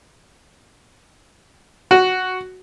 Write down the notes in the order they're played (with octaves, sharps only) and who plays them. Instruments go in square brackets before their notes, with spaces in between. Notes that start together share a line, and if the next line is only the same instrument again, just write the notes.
[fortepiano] F#4